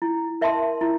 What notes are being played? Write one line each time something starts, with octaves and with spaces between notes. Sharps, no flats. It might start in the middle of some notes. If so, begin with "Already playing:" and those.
E4
A#4 E5 A5 C6
E4